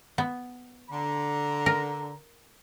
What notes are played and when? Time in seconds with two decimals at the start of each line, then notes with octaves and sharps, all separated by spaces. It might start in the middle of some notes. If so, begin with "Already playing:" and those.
0.18 B3
0.90 D3 A#5
1.66 A#4